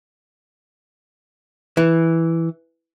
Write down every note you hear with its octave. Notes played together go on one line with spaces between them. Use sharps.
E3